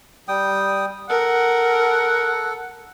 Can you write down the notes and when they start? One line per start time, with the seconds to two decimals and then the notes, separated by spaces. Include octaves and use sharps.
0.28 G3 G5 D#6
1.10 A4 A#4 F#5